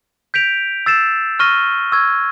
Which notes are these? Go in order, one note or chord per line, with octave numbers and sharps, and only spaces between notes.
G6 B6 D7 F7
E6 A6 C7 E7
C#6 F6 A#6 D#7 G7
C#6 E6 G#6